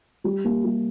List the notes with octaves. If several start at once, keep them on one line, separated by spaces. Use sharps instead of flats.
G3
A#3
G3